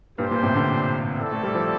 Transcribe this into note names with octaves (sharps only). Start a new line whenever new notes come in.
G2 A#2 D4 G4 C5
G2 A#2
A2 C3
A#2 D3
C4 E4 A4 D5
A3
G3
F3